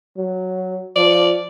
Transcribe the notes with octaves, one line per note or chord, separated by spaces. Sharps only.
F#3
F3 D5